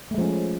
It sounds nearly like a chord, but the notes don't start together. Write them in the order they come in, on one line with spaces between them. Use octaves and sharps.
A3 G#3 F3 C#4